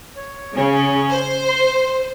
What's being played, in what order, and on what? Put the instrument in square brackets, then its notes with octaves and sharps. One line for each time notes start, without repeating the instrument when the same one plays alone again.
[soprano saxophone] C#5
[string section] C#3 [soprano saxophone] C#4
[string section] C5
[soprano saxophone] C6